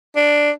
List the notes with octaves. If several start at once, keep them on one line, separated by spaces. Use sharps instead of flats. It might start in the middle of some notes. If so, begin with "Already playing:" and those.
D4